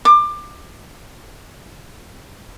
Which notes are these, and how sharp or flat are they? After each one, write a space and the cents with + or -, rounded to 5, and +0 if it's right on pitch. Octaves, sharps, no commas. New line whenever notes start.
D6 +25